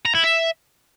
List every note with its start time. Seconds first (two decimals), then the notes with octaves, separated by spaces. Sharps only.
0.06 A#5
0.15 E4
0.24 E5